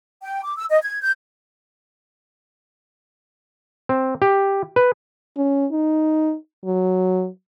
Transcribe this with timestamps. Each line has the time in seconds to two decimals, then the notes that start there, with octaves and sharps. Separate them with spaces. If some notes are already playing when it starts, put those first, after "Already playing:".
0.22 G5
0.44 D6
0.56 E6
0.70 D#5
0.82 G#6
1.01 G6
3.89 C4
4.22 G4
4.76 B4
5.37 C#4
5.72 D#4
6.65 F#3